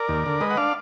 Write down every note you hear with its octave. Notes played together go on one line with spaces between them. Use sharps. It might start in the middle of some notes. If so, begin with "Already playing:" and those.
Already playing: A#4 D5
D#2
D3
G#3 B4 D#5
F#5
D4 D5 F5